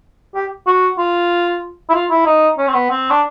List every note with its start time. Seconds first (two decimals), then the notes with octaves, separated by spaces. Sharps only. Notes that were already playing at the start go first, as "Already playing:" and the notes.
0.35 G4
0.67 F#4
0.99 F4
1.89 E4
1.94 F4
2.11 E4
2.26 D#4
2.58 C#4
2.68 C4
2.74 B3
2.90 C4
3.11 D4